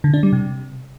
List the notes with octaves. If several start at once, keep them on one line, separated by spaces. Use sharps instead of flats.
D3
D4
G3
C3